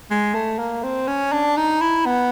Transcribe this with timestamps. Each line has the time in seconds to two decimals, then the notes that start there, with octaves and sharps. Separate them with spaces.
0.10 G#3
0.34 A3
0.59 A#3
0.83 C4
1.08 C#4
1.33 D4
1.57 D#4
1.81 E4
2.06 B3